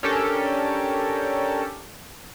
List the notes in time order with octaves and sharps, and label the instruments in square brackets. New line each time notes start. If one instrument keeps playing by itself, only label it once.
[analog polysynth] C#4 D4 G4 A4 A#4